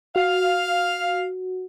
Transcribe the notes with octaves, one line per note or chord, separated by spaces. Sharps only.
F#4 F5